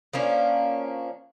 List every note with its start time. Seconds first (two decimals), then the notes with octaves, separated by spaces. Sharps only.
0.13 F3 A#3 C#4 D4